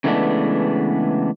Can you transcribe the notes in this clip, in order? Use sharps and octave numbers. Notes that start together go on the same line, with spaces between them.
C#3 E3 G#3 A3 B3 D4